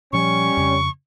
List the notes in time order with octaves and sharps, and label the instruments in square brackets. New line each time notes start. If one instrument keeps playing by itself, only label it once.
[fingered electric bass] A#2 F3 [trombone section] G3 C#4 [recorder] C#6
[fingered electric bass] F2 C#3